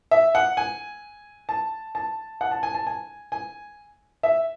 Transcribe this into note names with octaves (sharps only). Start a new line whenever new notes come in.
E5
F#5
G#5
A5
A5
F#5
A5
G#5
A5
G#5
G#5
E5